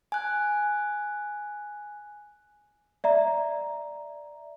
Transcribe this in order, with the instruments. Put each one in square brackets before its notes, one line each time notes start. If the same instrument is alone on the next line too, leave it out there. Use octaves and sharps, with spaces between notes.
[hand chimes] G#5 F#6
[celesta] D5 E5 A#5